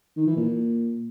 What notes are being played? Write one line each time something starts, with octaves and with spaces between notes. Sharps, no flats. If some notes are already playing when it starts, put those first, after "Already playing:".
D#3
E3
A#2